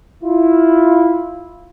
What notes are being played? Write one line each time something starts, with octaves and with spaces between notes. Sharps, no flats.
E4 F4